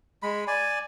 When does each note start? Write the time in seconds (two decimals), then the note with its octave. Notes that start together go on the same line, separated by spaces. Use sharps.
0.23 G#3 B5
0.47 D5 G#5